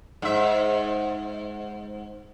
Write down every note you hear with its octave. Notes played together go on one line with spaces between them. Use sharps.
G#2 E5